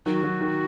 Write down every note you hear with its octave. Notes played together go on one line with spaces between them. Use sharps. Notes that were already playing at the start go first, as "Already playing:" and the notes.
D#3 F#3 F#4
D#3 F#3
D#3